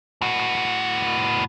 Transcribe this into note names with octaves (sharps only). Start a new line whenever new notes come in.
A2 F#4